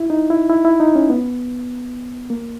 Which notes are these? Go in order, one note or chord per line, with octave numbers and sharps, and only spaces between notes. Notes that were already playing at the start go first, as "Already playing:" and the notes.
Already playing: E4
D#4
E4
E4
E4
D#4
C#4
B3
A#3